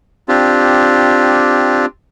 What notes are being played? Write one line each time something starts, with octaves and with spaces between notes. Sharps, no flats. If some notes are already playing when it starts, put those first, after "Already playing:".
C4 D4 F4 G4